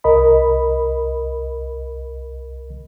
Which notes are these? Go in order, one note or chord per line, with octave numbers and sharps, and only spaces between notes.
C2 A#4 D#5 B5